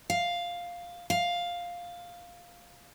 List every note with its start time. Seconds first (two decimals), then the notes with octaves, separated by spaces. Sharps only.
0.10 F5
1.10 F5